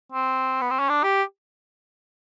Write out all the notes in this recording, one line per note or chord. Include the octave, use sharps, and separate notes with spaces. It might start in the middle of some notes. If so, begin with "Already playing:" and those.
C4
B3
C4
C#4
D4
G4